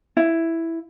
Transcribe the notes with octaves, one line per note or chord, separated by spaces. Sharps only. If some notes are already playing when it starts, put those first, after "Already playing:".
E4